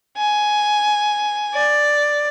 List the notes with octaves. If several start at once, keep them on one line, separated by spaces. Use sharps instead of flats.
G#5
D5